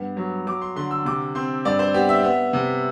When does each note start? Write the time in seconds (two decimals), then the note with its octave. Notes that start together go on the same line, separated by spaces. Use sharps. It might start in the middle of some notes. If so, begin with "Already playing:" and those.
Already playing: G2 B3
0.17 F#3
0.47 F#3 D6
0.62 C6
0.76 D3 C6
0.91 E6
1.05 C3 D6
1.35 C4 C6
1.65 G2 D5
1.79 C5
1.94 B3 G4
2.09 E5
2.23 B3
2.53 C3